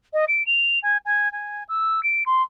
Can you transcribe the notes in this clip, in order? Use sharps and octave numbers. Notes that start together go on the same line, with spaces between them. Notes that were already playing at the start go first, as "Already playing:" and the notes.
D#5
D7
F7
G#5
G#5
G#5
E6
D7
C6